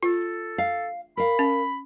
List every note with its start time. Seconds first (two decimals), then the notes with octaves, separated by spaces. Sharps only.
0.03 F4 A4
0.58 F5
1.17 A#4 F5 B5
1.39 C#4